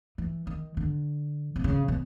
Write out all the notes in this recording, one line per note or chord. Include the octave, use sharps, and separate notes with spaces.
E3
D#3
D3
C3
C#3
B2